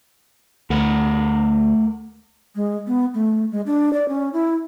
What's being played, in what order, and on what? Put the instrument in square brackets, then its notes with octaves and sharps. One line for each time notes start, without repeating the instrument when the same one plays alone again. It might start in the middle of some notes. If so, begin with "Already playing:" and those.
[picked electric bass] D2 [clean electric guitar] A3 A#4 F#5
[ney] G#3
B3
A3
G#3
D4
D5
C#4
E4